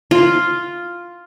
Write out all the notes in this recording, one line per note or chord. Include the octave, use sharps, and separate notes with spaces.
F4